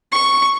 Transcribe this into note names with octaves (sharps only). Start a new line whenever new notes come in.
C#6